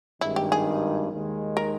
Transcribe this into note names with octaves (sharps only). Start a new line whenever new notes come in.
G#1 G2 D#3 G#3 E4
G4
G#4
D#2 D#3 G#3
A#4